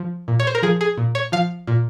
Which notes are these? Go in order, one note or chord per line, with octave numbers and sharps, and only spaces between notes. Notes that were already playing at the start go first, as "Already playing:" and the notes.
Already playing: F3
A#2
C#5
C5
A#4
F3 G#4
G#4
A#2
C#5
F3 F5
A#2